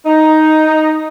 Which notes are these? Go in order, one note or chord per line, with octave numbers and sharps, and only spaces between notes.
D#4